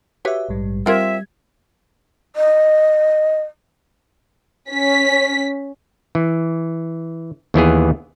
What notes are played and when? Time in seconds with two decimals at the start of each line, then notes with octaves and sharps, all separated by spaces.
0.25 F#4 G4 B4 C#5 E5
0.49 A#1 G#2 G3
0.86 G3 C4 F4 A#4 E5 G#6
2.36 D#5
4.70 C#4 B6
6.15 E3
7.54 D#2 E3 B3 G#4